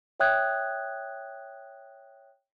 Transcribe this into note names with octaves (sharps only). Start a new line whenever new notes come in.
C#5 E5 G5 D#6 F#6 G#6